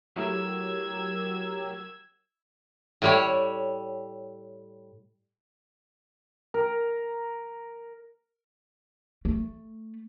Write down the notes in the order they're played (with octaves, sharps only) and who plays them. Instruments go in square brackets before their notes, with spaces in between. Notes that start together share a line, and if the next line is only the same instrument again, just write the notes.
[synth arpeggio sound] F#3 G4 A#4 [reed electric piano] A3 E4 F#4 [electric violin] E6 G#6
[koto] A2 G3 C#5
[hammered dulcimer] A#4
[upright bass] A3